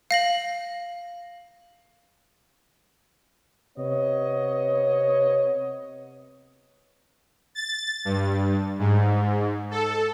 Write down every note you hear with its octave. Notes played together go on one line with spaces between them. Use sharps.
F5 A#6 F#7
C3 B3 C#5 D#5
A6
G2
G#2
A4